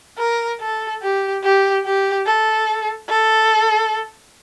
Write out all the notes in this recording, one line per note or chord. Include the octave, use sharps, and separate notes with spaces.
A#4
A4
G4
G4
G4
A4
A4